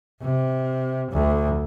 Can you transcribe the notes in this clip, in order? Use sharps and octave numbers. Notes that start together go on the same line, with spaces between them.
C3
D2